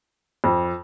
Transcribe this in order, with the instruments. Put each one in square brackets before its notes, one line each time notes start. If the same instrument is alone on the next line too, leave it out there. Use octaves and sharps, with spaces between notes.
[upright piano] F2